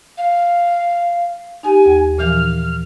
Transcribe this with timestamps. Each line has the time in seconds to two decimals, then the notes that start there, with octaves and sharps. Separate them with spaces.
0.17 F5
1.63 D#4 G4 G#5
1.86 D#2
2.18 A#2 E3 F3 F6